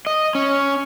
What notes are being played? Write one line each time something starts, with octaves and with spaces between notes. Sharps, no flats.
D#5
C#4